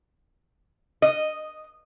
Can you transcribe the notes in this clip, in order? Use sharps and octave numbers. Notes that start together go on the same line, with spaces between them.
D#5